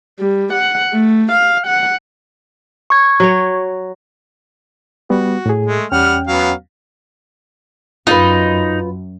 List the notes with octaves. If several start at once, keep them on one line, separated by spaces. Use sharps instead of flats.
G3
F#5
A3
F5
F#5
C#6 G#6
F#3 C#5
G3 B3 F#4
A2 G#4
G#3 A3
E2 G3 C#4 F#5 G5 F6
F#3 B3 F5
F#2 D#4 F4 B4